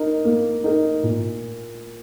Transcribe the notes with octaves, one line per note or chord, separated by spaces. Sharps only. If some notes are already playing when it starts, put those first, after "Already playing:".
Already playing: D#4 A#4
A#3
D#4 A#4
A#2